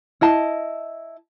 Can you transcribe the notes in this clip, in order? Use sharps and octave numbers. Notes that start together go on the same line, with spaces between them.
E4 D#5 A5